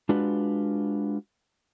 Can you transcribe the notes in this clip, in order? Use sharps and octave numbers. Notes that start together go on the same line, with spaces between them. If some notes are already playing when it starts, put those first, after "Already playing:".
G#3 D4 F4 F#4 B4